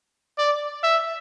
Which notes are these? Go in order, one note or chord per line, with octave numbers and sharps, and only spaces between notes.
D5
E5